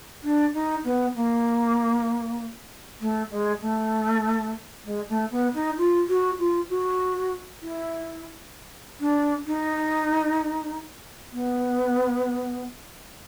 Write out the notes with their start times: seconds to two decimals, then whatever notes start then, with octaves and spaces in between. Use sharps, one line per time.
0.24 D4
0.54 D#4
0.84 B3
1.15 A#3
3.01 A3
3.31 G#3
3.62 A3
4.85 G#3
5.09 A3
5.31 B3
5.54 D#4
5.77 F4
6.09 F#4
6.39 F4
6.69 F#4
7.62 E4
9.00 D4
9.47 D#4
11.32 B3